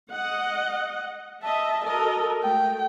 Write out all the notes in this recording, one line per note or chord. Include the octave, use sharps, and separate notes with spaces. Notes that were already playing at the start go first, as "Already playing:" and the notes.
D#5 F#5
D#5 E5 A5
F#4 A4 A#4 D#5
A3 G5